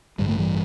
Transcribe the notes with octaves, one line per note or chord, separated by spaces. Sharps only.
A1 G2 D3 G3
A3
E3 G3